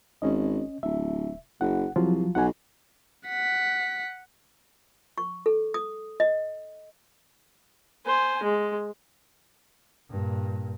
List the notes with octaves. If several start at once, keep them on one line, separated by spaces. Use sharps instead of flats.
G#1 C#4 D#5
D1 E5
F#1 F#5
C2 F3 F#3 F4
B1 F#5 G#5
F#5 B6
C#6
A4
D#6
D#5
C5 G#5
G#3
G2 A#2